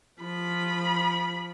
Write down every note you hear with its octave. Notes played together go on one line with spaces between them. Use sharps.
F3 B5